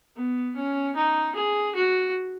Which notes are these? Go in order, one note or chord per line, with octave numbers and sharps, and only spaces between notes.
B3
C#4
D#4
G#4
F#4